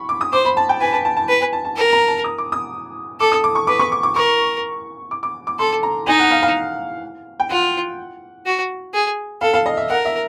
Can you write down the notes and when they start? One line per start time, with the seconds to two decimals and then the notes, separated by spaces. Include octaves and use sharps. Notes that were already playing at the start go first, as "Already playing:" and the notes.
Already playing: B5 C#6
0.09 D6
0.21 D#6
0.33 C5 D6
0.45 B5
0.57 A5
0.69 G5
0.81 B4 G#5
0.93 A5
1.05 A5
1.17 A5
1.29 B4
1.41 G#5
1.53 A5
1.65 A5
1.77 A#4
1.93 A#5
2.08 A5
2.24 D#6
2.38 D6
2.52 D#6
3.20 A4 D6
3.32 D#6
3.44 D6
3.55 C#6
3.67 B4 D6
3.79 C#6
3.92 D6
4.03 D6
4.15 A#4 C#6
5.11 D6
5.23 D6
5.47 D6
5.59 A4 C6
5.83 A#5
6.07 D#4 G#5
6.19 F#5
6.31 F5
6.42 F5
7.40 G5
7.50 F4 F#5
8.46 F#4
8.94 G#4
9.41 A4 F5
9.53 F5
9.66 D#5
9.77 E5
9.89 A#4 F#5
10.05 E5